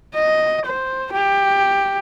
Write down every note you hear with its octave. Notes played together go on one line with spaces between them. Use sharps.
D#5
C5
G4